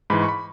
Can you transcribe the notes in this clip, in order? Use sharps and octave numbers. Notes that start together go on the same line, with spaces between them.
G#2 E3 B5
C#6
B5